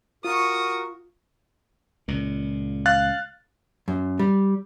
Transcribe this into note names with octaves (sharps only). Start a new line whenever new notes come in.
F4 F#4 A#4 C#6 D#6
C#2 A#2
F5 F#6 A6
F#2
G3